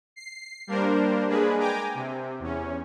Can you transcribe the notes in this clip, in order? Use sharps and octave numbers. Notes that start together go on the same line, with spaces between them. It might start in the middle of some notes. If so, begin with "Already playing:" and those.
C7
G3 A#3 D4 A#4 C5
G#3 A#3 D4 G#4 B4
G5 G#5 A#5 D6
C3
E2 C#4